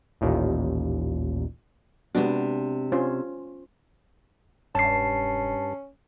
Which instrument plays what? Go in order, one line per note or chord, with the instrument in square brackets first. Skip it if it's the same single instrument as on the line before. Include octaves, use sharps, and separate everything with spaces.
[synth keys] A1 D#2 A#2
[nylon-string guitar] C3 D4 [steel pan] G#3 B3 F#4
[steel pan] C#4 F4 C5
[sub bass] E1 [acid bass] G2 [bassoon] C#4 [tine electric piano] A5 C7